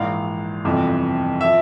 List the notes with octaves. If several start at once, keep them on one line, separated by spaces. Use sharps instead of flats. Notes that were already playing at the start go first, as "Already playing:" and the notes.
Already playing: A#1 G#2 E3 F5
G1 F2 C3 E3
F3 E5